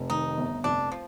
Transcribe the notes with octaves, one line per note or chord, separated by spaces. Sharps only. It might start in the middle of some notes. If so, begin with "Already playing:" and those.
Already playing: F1
D#3 D#4
G1
F1 D4
F3